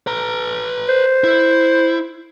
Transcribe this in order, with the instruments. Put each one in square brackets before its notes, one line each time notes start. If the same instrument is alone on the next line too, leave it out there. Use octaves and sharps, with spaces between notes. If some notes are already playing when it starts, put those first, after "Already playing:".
[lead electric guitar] B4 A#5
[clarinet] C5
[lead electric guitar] E4